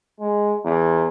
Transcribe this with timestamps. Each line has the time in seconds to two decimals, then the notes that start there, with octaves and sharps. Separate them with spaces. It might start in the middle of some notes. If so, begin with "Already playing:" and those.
0.20 G#3
0.65 E2